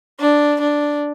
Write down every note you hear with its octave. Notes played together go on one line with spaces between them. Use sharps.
D4
D4